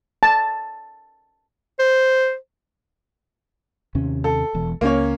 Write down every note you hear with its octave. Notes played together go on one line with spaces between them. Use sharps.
A5
C5
D#2 C3 C#4
A4
E1 E2
C#2 A#3 C#4 C#5